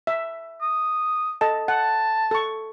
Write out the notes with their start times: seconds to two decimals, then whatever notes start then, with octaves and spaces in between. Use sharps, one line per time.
0.07 E5
0.62 D#6
1.41 A4 D#5 A5
1.68 F#5 A5
2.31 A4 C#6